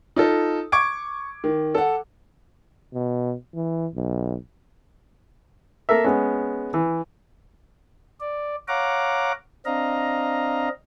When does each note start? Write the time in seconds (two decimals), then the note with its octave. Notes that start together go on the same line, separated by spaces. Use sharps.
0.16 D#4 F4 A4
0.72 C#6 D6 G#6 D7
1.44 D#3
1.75 A4 F#5
2.94 B2
3.54 E3
3.95 B1
5.89 A#3 A4 A#4 E5
6.04 G#3 B3 C#4
6.74 E3
8.20 D5
8.68 C#5 F5 F#5 A#5 D6
9.66 C4 D4 D#5 F5 A#5